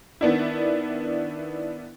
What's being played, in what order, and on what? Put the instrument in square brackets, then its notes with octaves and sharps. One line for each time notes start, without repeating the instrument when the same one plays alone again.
[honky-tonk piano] D#3 B3 D4 E4